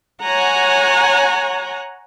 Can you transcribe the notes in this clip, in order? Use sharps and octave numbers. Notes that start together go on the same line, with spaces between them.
C#5 F#5 G#5 A#5